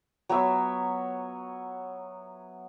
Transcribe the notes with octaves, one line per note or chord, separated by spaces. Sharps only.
F#3 B3 C#5 E5